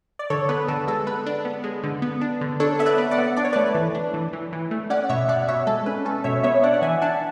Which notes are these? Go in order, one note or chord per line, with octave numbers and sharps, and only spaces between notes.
D5
D3 A4 C#5
B3 B4
D3 A4
G#3 A4
B3 B4
D4
B3
G#3
D3
B3
D4
D3
D4 A4 C#5
B3 E5
B4 D5
B3
D5 F#5
B3
D4 D5
C#5
A3 B4 D5
E3
D4
E3
E3
E3
A3
C#4 D5 F#5
B2 C#5 E5
B2 D5 F#5
B2 C#5 E5
G#3 A4
C#4 B4
C#4 A4
B2 C#5 E5
B3 C#5 E5
D4 D5 F#5
F#5
E3 E5 G#5
D4 F#5 A5